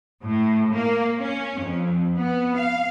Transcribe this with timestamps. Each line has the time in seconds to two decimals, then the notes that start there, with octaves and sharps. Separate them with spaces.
0.24 A2
0.72 A#3
1.19 C#4
1.61 F2
2.17 B3
2.56 F5